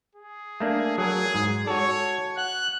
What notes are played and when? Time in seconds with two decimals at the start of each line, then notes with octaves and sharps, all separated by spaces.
0.15 G#4
0.60 A3 A#3 D4
0.98 F#3 G#4 A#4
1.35 G#2
1.67 F#4 A4 C#5
2.38 F#5 F#6